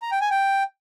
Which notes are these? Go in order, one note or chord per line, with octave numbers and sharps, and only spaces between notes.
A#5
G5
G#5
G5